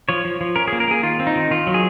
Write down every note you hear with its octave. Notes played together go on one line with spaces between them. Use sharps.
F3 C#5
F3
F3
C#4 A#4
A#3 G#4
A#4
A#3 G#4
D#3 F4
C4
D#4
D#3
D#3 F4
F#3
G#4